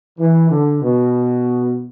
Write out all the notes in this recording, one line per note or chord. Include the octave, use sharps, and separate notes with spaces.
E3
D3
B2